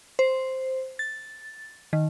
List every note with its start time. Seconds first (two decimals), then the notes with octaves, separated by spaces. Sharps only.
0.19 C5
0.99 A6
1.93 D#3